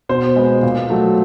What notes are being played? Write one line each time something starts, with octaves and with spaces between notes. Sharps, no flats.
B2 C5
G#3 B3
A#2
F#3 A3